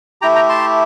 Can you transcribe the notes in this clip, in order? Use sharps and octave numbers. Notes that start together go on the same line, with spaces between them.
A3 E4 G4 G5 A#5
G5 A#5
A5 C6